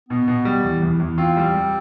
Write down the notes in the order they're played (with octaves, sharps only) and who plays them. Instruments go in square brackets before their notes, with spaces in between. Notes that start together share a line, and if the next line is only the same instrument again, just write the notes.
[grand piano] B2 [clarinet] B3
[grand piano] B2
G3
E2
E2
E2
[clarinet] C4 [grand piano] F4
[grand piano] G3
G3